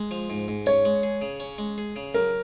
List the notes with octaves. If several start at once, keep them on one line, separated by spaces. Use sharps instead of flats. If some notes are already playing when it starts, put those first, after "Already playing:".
Already playing: G#3
F3
G#2
G#2
C#4 C#5
G#3
G#4
C#3
C#4
G#3
G#4
C#3
F#3 A#4